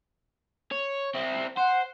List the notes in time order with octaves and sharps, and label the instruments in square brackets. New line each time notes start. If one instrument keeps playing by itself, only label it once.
[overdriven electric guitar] C#5
C4 E4
[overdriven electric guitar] C5 [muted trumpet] F#5